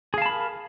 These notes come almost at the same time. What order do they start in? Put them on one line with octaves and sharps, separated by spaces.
G#4 F5 A5 B5 A#4